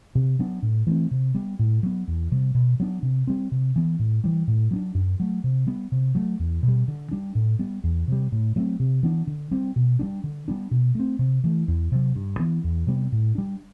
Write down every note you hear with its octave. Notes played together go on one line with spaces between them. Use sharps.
C3
F#3 B3 D4
A2
E3 A3 C4
C3
G3 B3
A2
F#3 B3
E2
C3 G3
B2
F#3 B3 D4
C3
G3 C4
C3
E3 B3
A2
E3 G3
A2
F#3 B3 D4
F#2
F#3 A3
C3
G3 B3
C3
F#3 A3
E2
B2
G3
D3
G3 D4
A2
G3 B3
E2
C3 G3
A2
F#3 A3 C4
C3
E3 B3 D4
D3
G3 C4
B2
G3 B3 D4
D3
G3 B3 D4
B2
A3 C4
C3
E3 A3
E2
C3 F#3
G2
E3 B3
E2
C3 G3 B3
A2
G3 D4